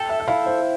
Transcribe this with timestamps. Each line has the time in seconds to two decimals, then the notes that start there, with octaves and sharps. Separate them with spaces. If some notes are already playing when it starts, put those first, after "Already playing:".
Already playing: A4 G5
0.09 E5
0.20 E5
0.27 E4 F5
0.46 C5